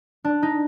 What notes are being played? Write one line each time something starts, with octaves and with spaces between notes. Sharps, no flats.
D4
D#4